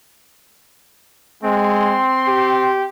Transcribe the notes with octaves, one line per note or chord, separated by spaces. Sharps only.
G#3 C4 C6
G4